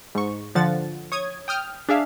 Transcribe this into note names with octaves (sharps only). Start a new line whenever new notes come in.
G#2 C#6
D3 F3 F#5 A6
C#5 D#6 G#6
G5 D#6 F6 G6
D4 G#4 E5 F5